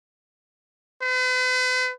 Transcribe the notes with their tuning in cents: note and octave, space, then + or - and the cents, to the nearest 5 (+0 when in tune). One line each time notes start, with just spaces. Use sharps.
B4 +45